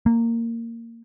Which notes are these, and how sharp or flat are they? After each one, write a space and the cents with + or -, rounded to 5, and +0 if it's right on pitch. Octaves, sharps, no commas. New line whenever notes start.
A#3 -15